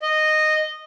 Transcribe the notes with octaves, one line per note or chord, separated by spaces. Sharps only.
D#5